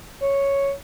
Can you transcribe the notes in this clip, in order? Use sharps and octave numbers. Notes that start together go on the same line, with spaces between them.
C#5